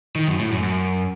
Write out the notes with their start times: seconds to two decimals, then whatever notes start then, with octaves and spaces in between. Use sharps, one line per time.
0.15 D#3
0.27 F#2
0.39 A2
0.51 F#2
0.63 F#2